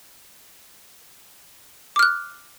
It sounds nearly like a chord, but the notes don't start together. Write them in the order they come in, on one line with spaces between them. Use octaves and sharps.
D6 F6 F#6